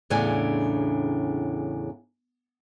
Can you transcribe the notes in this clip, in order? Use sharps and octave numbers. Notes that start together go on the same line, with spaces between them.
E2 A2 C#3 D4 G#5